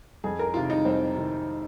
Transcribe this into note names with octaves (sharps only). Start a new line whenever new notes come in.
F2 G#4
A#4
C3 D#3 F4
D#4
F2 C4
C3 D#3